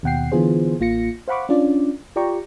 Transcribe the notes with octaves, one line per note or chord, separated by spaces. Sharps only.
D#2 B2 F#5 G5 C7
D3 E3 B3 F4 G#4 C5
A1 A#3 F4 A#6 C#7
C5 F5 F#5 B5 C#6 D6
C#4 D4 F4 D5
F4 G4 D5 G5 A#5 C#6